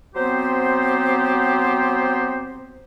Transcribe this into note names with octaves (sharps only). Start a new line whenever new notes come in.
F#3 B3 C4 G4 C5